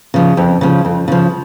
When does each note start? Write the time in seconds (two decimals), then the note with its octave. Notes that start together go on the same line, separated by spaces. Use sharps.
0.14 C#3 F3
0.37 F2
0.61 C#3 F3
0.85 F2
1.08 C#3 F3